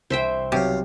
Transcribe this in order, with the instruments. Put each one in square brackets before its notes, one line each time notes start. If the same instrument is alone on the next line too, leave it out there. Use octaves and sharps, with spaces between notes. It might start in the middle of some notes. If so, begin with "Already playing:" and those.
[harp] C2 [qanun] C5 E5 G5
[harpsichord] B1 F#3 F5 [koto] C3 G4